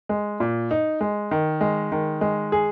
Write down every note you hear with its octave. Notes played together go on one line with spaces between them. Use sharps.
G#3
A#2
D#4
G#3
D#3
G#3
D#3
G#3
G#4